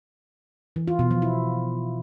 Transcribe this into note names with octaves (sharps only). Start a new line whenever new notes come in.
E3
F4
B2
F3
E4